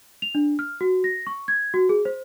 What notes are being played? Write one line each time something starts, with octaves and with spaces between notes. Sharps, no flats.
F7
D4
F6
F#4
A#6
C#6
G#6
F#4
G#4
C5